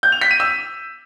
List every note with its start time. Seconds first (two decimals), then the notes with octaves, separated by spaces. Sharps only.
0.03 G6
0.12 F7
0.21 B6
0.31 D#7
0.40 E6